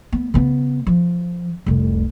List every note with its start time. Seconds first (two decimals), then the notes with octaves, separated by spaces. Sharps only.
0.12 B3
0.34 C#3 B3
0.87 F3
1.66 F1 C2